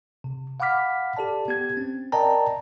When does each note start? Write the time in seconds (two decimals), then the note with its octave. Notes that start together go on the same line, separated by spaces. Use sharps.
0.24 C3
0.60 F5 F#5 B5 D6 F6 B6
1.17 G4 A4 D5 A5
1.48 B3 G4 G#6
1.77 C4 C#4
2.12 A#4 D5 D#5 G5 A5 A#5